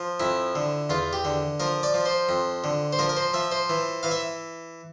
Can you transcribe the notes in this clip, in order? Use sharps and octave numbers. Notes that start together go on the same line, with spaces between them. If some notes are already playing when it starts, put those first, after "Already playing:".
Already playing: F3
F2 E4
D3
E2 F4
G4
D3
F3 A#4
D5
F3
C5
F2
D3
C5
F3 A#4
A#4
C5
F3 E5
C5
E3
E3 F5
E5